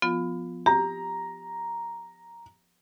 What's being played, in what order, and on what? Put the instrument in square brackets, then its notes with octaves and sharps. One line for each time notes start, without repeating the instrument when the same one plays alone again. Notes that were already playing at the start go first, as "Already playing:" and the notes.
[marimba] F3 B3 F4
[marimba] G4 [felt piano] A#5